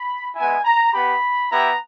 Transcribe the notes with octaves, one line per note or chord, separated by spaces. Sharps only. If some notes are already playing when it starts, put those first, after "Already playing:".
Already playing: B5
G#3 B3 E4 G#5
A#5
B3 G4 B5
B3 E4 G4 A#5